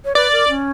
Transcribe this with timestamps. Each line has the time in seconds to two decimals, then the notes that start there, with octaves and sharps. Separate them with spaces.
0.05 C#5
0.15 B4 D5
0.32 A#4
0.48 C#4